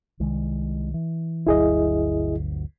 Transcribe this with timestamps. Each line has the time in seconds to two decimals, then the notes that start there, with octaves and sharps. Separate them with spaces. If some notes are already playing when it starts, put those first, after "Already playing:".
0.20 C2 D#3 G#3
0.94 E3
1.47 G1 D2 F#3 E4 G#4 D#5